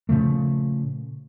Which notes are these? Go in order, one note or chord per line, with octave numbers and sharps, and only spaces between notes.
A#2 C#3 F3 A3